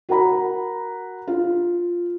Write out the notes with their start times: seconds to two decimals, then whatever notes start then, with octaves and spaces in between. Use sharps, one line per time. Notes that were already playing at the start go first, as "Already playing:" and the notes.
0.09 F#4 A#4 F#5 A#5 B5
1.27 F4